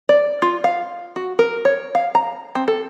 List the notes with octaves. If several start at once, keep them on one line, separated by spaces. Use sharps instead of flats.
D5
F4
F5
F#4
A#4
C#5
F5
A#5
C4
A4